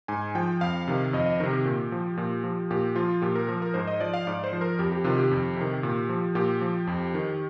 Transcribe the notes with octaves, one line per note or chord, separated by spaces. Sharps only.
G#2 G#5
F3 G5
F2 F5
C3 D#3
F2 D#5
D#5
C3 D#3 A#4
G4
A#2
F3
A#2
F3
A#2 G4
F3 F4
A#2 G4
A#4
F3
A#4
G#2 C5
D#5
F3 D5
F5
G#2 D5
C5
F3
A#4
F2 G4
G4
C3 D#3 F4
G4
F2
C3 D#3
A#2
F3
A#2 G4
F3
F2
D#3